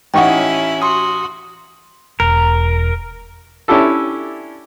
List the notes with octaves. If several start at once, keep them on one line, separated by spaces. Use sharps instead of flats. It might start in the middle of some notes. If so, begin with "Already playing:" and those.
A1 C#4 D#4 E4 F#5 G5 C#6
F#4 C6 D#6
E1 A#4
C#4 D4 E4 G4 A4